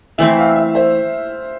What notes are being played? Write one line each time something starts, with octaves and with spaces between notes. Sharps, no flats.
E3 A3 C4 E5
F5
E5
C5